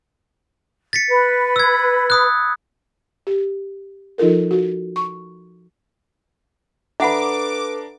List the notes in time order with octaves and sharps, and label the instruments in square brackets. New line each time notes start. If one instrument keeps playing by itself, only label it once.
[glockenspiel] A6 B6 C#7
[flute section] B4
[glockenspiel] E6 G#6
B5 D#6 F#6
[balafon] G4
F3 D#4 F4 A4 A#4
F#4
C#6
[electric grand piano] D4 A#5 [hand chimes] A4 B4 [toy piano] E5 F#5 B5 [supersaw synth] D6